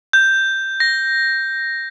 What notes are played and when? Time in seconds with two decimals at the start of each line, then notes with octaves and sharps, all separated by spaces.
0.13 G6
0.80 A#6